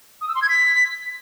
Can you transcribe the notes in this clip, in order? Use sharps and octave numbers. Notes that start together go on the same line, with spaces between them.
D#6
E6
C6
G#6
B6